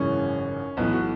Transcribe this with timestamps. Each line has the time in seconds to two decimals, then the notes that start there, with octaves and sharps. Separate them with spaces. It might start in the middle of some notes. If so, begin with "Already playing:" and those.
Already playing: G#1 F#2 C#3 E3 C#4
0.77 B1 A2 E3 B3
0.93 F#4